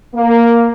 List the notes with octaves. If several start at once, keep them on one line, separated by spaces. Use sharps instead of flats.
A#3